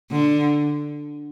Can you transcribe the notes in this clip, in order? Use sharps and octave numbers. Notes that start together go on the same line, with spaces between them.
D3